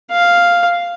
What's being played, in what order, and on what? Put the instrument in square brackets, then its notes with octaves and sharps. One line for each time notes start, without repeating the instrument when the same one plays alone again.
[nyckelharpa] F5